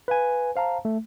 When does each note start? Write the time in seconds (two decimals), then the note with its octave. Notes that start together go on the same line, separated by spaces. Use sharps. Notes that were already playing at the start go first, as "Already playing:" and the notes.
0.08 B4 F5 G#5
0.56 C5 F5 A5 A#5
0.85 A3